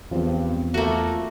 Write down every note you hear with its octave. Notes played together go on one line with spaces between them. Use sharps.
E2 G2 F3 C4 F4
A3 A#3 F#4